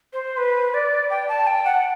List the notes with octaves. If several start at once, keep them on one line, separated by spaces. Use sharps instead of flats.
C5
B4
D5
G5
A5
G5
F#5